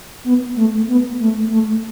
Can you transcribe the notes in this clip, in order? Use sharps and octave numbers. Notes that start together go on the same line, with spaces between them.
B3
A3
B3
A3
A3